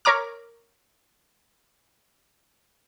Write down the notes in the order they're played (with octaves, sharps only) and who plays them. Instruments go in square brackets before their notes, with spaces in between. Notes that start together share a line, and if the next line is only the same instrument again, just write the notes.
[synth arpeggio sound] A#4 C#5 A#5 D6 F6